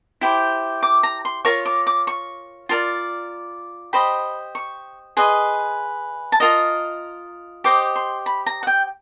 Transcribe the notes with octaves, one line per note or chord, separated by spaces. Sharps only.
E4 G4 C5
D6
A#5
C6
F4 A#4 C#5 C#6
D6
D6
C#6
F4 A#4 D5
G4 C5 D#5 B5
C#6
G#4 B4 D#5 C6
A5
F4 A#4 D#5 A#5
G4 C5 D#5 D6
C6
B5
A#5
F#5
G5